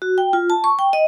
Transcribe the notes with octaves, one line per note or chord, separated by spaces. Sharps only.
F#4
G5
F4
A5
C#6
G5
D#5